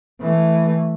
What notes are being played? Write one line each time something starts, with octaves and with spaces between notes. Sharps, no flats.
E3 A3